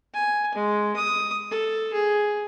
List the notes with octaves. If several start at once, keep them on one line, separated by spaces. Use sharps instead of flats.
G#5
G#3
D#6
A4
G#4